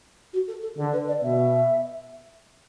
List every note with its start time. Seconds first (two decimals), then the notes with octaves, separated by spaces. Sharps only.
0.33 F#4
0.48 A4
0.63 A4
0.78 D3 A4
0.93 B4
1.08 D5
1.22 B2 E5